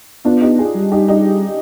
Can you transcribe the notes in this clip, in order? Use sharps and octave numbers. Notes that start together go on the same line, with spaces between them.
B3 D4 F4
D#4 G4
F4 G#4
G3
D#4 G4
D#4 G4